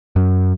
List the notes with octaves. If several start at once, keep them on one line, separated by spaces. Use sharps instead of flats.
F#2